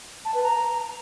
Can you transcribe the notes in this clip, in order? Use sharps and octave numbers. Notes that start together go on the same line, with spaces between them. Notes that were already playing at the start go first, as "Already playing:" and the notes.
A5
B4
A#5